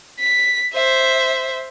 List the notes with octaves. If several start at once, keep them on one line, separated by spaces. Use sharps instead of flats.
B6
C5 E5